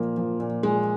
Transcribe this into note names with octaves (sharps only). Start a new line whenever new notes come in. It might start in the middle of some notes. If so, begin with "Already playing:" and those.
Already playing: A#2 F3 A#3
F3
A#2
A#2 G#3